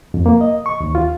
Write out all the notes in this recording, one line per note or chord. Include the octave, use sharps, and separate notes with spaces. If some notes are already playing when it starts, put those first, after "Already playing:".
F2
A#3
D#5
C#6
D#2
F4